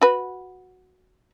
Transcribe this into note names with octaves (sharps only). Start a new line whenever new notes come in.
F#4 B4